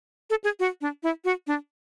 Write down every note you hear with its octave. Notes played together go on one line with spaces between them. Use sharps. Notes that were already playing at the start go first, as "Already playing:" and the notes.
A4
G#4
F#4
D4
E4
F#4
D4